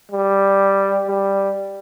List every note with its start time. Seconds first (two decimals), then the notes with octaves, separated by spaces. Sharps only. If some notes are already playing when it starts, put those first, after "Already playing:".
0.12 G3
1.07 G3